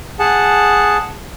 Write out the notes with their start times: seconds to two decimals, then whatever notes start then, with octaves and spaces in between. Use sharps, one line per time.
0.19 G#4 F#5 A5